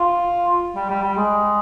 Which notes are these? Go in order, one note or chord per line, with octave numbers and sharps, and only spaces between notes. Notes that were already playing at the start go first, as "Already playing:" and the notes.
Already playing: F4
G3
G3
G3
G#3